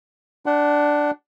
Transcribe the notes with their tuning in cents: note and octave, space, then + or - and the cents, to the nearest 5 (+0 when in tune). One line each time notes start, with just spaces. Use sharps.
D4 +0 F#5 +25